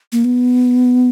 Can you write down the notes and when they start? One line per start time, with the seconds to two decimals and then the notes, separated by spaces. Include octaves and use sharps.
0.12 A#3
0.24 B3